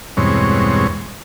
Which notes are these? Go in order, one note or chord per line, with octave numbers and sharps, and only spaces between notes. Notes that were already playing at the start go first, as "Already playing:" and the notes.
E2 G2 B2 G#3 C4 C#5